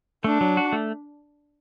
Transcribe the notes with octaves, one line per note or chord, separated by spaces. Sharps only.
A3 D4
F#3
F#4
A3